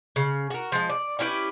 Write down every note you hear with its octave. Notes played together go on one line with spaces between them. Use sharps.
C#3
F#4 A#4
F3 G#3
D5
C#4 E4 G4 B4